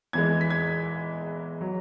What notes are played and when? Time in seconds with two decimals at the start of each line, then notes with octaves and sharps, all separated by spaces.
0.13 E2 E3 G#3 G#6
0.41 B6
0.50 G#6
1.61 F#3